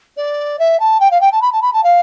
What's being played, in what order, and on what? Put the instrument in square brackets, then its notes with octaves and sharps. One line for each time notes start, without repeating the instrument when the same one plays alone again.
[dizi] D5
E5
A5
G5
F5
G5
A5
B5
A5
B5
A5
F5